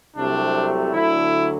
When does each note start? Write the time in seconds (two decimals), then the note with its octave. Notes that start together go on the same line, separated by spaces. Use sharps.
0.17 C2 C3 F#3 A3 D4
0.93 D2 D3 F#3 E4